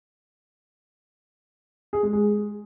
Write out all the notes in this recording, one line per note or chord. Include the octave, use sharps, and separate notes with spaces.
G#4
G#3
G#3